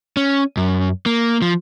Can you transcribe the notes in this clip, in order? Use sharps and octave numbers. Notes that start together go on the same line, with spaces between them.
C#4
F#2
A#3
F3